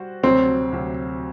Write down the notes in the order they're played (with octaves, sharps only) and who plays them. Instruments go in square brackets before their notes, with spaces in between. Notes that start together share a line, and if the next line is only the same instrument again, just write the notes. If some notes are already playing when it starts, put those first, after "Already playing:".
Already playing: [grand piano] G3 F#4 C5
[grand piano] D2 C3 F#3 [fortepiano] C4
[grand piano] D2 C3 F#3